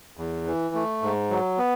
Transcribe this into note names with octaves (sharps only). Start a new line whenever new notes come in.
E2
E3
A3
G#2
F#3
B3